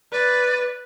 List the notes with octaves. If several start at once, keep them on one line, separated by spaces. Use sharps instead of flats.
B4 D5